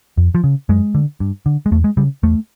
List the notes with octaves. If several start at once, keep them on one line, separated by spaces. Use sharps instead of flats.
F2
F3
C#3
F#2 G#3
D3
G2
D3
G#3
E2 A3
G#3
C#3 G3
E2 A3